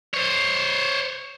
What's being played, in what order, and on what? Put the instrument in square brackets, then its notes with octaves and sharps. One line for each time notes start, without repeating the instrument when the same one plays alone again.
[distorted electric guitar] C5 C#5